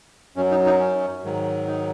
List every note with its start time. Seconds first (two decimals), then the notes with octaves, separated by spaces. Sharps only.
0.36 F#2 F#3 C#4
0.51 D#4
0.66 D#4
0.79 C#4
1.23 G#2 D#3 F#3
1.67 D#4